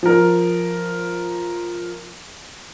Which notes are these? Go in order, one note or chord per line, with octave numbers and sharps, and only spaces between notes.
F3 A#4